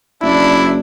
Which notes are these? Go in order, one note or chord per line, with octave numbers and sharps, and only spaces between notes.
F#1 D4 E4